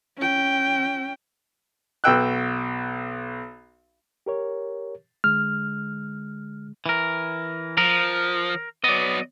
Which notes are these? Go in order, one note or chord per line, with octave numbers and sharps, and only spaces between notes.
C#4 G5
B1 F#4 B4 G5 E6 F#6
G4 A#4 C#5
D3 G#3 F6
E3 A#4
F3 A#4
F#3 B3 D5 D#5